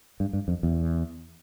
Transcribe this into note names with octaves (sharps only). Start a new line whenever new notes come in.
G2
G2
F2
E2